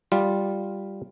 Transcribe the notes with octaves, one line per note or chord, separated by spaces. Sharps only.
G3 F4